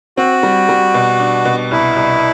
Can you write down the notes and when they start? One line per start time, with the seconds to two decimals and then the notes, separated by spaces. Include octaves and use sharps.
0.17 C4 F#4
0.43 G3
0.69 G3
0.94 B2
1.20 D4
1.45 B2
1.71 C2 E4
1.96 C2